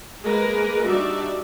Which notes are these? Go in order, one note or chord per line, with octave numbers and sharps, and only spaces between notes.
G#3 A#3 A#4 B4
G3 D4 D#4 F#4 D5 E5